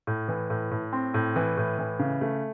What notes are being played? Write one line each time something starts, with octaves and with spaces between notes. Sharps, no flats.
A2
E3
A2
A2
C4
A2
E3
A2
E3
C#3
A3